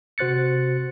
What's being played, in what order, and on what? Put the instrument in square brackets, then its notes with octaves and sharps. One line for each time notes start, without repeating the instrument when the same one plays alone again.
[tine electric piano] C3 F#4 C5 F#6 A6 C#7